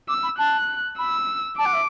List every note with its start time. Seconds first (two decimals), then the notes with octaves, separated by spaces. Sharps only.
0.08 D6 E6
0.23 B5
0.38 A5 F#6
0.98 B5 E6
1.58 A5 D6
1.65 F#5
1.73 E5